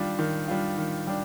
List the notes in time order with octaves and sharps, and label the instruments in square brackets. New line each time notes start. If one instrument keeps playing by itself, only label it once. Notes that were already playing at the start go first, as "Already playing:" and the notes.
Already playing: [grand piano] D#3 G3 D4 F4
D#3
G3 D4 F4
D#3
G3 D4